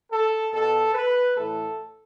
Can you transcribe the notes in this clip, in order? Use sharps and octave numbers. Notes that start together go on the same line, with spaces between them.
A4
B2 A4
B4
A2 E3 A4